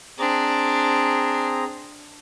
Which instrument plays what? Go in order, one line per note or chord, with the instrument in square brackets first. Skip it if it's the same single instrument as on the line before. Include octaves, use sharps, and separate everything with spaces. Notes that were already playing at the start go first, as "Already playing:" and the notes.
[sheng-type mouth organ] C4 G#4 A#5 [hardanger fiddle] D4